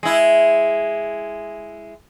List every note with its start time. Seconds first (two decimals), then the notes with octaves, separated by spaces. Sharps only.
0.03 G#3 E4